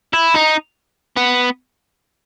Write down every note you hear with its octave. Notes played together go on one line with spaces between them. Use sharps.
E4
D#4
B3